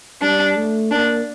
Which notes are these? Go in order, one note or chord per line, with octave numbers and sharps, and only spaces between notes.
G3 D4
A3
A#3 D4